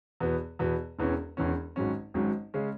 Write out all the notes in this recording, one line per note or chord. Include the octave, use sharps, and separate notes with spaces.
E2 B2 B3
E2 B2 B3
E1 E2 E3 C#4
E1 E2 E3 C#4
G#1 G#2 F#3 C#4
G#1 G#2 F#3 C#4
C#3 G#3 C#4